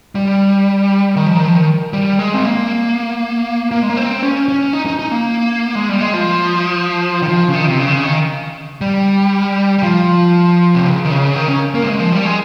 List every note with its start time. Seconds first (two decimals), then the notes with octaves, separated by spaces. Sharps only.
0.15 G3
1.17 D#3
1.27 F3
1.36 D#3
1.46 F3
1.55 D#3
1.93 G3
2.19 G#3
2.34 C4
2.44 A#3
3.71 A#3
3.82 G#3
3.90 A#3
3.97 C4
4.22 C#4
4.48 C#4
4.73 D#4
4.86 D#4
4.99 D#4
5.12 A#3
5.75 G#3
5.89 G3
6.01 G#3
6.14 F3
7.22 D#3
7.28 F3
7.48 C#3
7.54 D#3
7.68 C3
7.79 C#3
7.88 D#3
7.92 C#3
8.04 D#3
8.81 G3
9.78 G3
9.83 F3
10.75 C3
10.85 C#3
11.05 D#3
11.10 C#3
11.36 D#3
11.48 C#4
11.74 A#3
11.82 G3
11.87 G#3
12.00 F3
12.12 G3
12.25 G#3